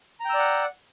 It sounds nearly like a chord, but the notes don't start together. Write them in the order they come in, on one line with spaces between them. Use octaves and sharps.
A#5 G5 E6 D5 F#5